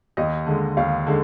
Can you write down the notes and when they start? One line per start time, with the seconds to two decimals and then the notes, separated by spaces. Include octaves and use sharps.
0.17 D#2 D#5
0.47 D3 G#3
0.77 D#2 F5
1.07 D3 G#3